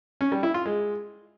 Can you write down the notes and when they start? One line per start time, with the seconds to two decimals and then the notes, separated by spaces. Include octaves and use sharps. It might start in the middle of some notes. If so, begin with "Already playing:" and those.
0.21 C#4
0.32 G3
0.43 E4
0.54 F4
0.66 G#3